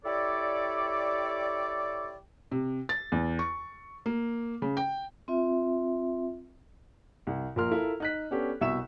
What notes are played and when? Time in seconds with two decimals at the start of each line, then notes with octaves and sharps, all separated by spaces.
0.04 E4 G4 A4 C#5 D5
2.51 C3
2.89 A6
3.12 E2
3.39 C#6
4.06 A#3
4.62 C#3
4.77 G5
5.28 C4 F4 E5
7.27 C2
7.56 A#1 F3 A#4 C6 F6
7.71 E4 F4 A4 A#4
8.00 D#4 F#6 B6
8.31 B3 C#4 D4 G4 A4
8.61 C2 B2 E5 C#6 E6 E7